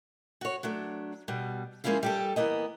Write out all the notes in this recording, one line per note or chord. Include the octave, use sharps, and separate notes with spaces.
F#4 C#5
F#3 A3 D4
B2 G3
F3 G#3 A#3 C#4 E4 F4
G3 G4 A4
E3 A#3 B3 D#5